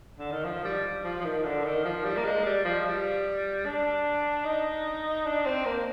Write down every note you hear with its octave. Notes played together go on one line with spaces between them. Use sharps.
D3
D#3
F3
G3
F3
F3
D#3
D3
D#3
F3
G3
A#3
G#3
G3
F3
G3
D4
D#4
D4
C4
A#3